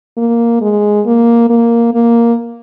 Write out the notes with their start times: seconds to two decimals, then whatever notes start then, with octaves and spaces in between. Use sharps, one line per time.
0.17 A#3
0.61 G#3
1.06 A#3
1.50 A#3
1.94 A#3